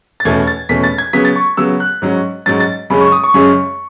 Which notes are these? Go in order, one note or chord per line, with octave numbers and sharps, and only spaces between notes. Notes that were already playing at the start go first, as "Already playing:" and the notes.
A6
E2 B2 A3 C#4 G#6
A6
E2 B2 A3 C#4 B6
A6
G#6
C#3 F#3 B3 B6
A6
C#6
C#3 F#3 B3 E6
F#6
G#2 F#3 C#4
G#2 F#3 C#4 A6
A6
F#2 C#3 G#3 C#4 B5
C#6
D#6
C#6
F#2 C#3 G#3 C#4